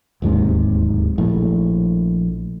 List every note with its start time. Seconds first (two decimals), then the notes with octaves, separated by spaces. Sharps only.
0.22 D1 D#2 G#2 C3
1.18 A#1 A2